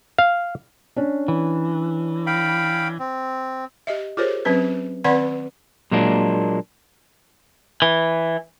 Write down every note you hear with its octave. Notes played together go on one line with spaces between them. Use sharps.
F5
C#4 D4
E3
F5 G5 B5
C4
G4 D#5 E5
F4 G4 G#4 A#4 C5 C#5
F#3 C4 C#4 B4
D#3 C4 B4 D5 F#5 B5
A#2 F#3 G#3 A#3 D4
E3